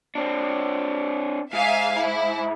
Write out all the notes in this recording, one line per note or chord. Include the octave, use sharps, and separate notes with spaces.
C4 D4
G#2 E5 F5 G#5
E4